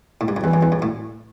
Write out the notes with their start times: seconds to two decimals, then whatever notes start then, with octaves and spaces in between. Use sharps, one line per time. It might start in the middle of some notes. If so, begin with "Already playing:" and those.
0.21 A2
0.28 G2
0.37 F#2
0.44 E2 E3
0.54 F#2
0.63 E2
0.72 F#2
0.82 A2